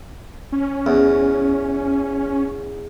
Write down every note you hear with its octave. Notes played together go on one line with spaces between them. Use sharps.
C#4
E2